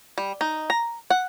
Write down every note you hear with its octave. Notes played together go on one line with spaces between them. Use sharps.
G3
D#4
A#5
F#5